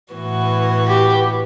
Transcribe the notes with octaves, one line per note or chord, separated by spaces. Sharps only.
A2 E3 B3 F#4
G4